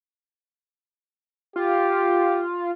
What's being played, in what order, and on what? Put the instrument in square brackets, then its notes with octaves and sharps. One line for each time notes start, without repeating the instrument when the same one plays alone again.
[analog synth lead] F4 [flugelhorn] G4